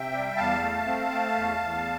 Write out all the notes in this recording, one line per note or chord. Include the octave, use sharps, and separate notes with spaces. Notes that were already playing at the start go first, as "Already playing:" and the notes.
Already playing: C3 E5 G5
G3
E2 F5 A5
A3
C4
A3
E2
E2